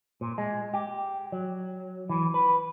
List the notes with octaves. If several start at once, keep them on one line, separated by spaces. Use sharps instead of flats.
A#2
G#3
G4
F#3
E3
B4